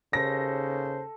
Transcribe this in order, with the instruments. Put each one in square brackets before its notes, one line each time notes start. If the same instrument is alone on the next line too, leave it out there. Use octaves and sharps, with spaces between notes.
[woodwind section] D#2 C5 [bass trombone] C#3 [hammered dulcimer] A4 [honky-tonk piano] A#6